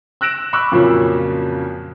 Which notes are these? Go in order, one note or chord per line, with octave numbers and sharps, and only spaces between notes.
E6 F#6 A#6 D7 E7
B5 C#6 D6 E6 F#6
F2 A#2 C#3 F3 F#3 C#4